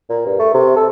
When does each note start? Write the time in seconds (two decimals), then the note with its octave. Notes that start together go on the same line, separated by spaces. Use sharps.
0.09 A#2
0.26 G2
0.39 A3
0.54 C3
0.76 A4